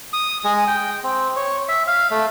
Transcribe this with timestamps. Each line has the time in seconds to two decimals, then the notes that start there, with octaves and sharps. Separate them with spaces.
0.13 D#6
0.44 G#3
0.67 G5
1.03 C4
1.36 C#5
1.68 E5
1.87 F5
2.10 A3